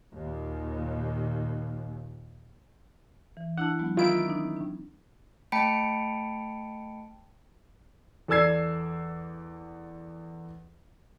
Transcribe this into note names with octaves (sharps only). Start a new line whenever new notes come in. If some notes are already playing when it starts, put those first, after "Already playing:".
D#2 A#2
E3
D4 E4 F#5 A5
F#3 G#3 B3
D#3 E4 F4 D7
C4 D4 D#4
D4
A3 G5 A5 B5 C#7 D7
E2 A4 D5 E6 G#6 C7